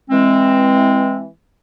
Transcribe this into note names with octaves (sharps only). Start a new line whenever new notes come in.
E3 G#3 C4